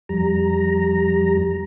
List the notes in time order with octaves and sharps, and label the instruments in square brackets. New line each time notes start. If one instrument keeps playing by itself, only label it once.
[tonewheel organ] F2 G3 A#5